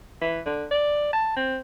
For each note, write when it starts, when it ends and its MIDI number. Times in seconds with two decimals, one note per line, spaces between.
0.22 0.40 52
0.46 0.66 50
0.71 1.10 74
1.13 1.34 81
1.36 1.58 60